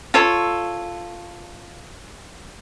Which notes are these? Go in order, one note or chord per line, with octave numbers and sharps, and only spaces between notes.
F4 A4 C#5